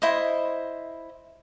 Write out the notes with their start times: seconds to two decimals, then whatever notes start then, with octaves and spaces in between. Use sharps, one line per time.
0.02 E4 C5 D#5